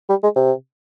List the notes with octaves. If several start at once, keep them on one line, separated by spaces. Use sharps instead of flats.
G3
G#3
C3